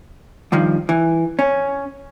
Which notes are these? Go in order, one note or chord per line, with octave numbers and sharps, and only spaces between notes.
G2 D#3 F3
E3
C#4